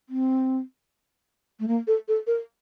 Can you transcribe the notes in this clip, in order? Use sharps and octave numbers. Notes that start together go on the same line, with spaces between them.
C4
A3
A#3
A4
A4
A#4